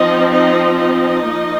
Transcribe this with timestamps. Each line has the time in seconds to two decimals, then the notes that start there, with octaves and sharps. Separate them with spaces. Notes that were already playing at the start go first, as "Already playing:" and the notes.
Already playing: F3 C4 D#4 D#5
0.32 D#4 D#5
0.78 D#4 D#5
1.25 F3 A#3